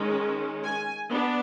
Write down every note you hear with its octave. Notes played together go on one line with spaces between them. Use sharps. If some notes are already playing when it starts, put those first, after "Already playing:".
Already playing: D#3 G#3 C#4
G#5
B3 D4